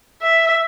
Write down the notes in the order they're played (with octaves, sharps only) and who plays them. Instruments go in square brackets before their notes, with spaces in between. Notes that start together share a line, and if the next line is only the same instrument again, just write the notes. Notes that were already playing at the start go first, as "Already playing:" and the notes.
[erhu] E5